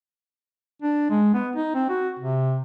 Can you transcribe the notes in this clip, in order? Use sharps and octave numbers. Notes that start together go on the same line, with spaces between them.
D4
G#3
B3
D#4
C4
F#4
C3